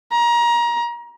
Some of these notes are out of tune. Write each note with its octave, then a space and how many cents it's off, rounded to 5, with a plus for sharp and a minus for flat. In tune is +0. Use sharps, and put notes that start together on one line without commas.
A#5 +25